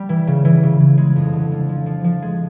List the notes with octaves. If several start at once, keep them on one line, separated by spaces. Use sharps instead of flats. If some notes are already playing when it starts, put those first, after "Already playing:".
Already playing: G3
E3
C#3
E3
C#3
C#3
G#3
F2
D3
F3
F3
F3
F3
G#3